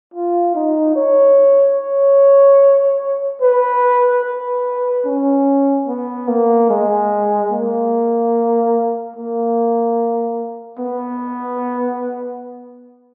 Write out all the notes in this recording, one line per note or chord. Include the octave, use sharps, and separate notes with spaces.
F4
D#4
C#5
C#5
B4
B4
C#4
B3
A#3
G#3
A#3
A#3
B3